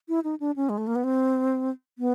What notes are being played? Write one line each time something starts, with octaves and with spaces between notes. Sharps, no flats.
E4
D#4
D4
C#4
G#3
A3
A#3
B3
C4
B3